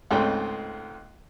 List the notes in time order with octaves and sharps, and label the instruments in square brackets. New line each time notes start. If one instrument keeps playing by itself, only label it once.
[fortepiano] C#2 G#2 C#3 A3 C4 G5